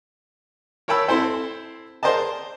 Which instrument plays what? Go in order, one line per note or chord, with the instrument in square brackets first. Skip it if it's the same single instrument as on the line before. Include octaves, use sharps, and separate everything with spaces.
[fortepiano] A#4 C#5 G5 A5 B5 E6
C4 E4 A4 C5
G#4 A#4 C5 D5 D#5 A5